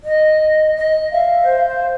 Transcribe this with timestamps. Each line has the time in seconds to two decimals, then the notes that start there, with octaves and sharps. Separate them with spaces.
0.04 D#5
0.77 D#5
1.12 E5 F5
1.43 C5